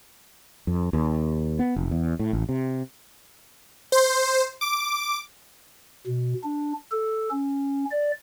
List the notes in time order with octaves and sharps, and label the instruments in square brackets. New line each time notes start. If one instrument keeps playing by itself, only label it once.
[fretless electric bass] F2
D#2
B3
F1
E2
A2
A1
C3
[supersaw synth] C5
D6
[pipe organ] B2
D4
A4
C#4
D5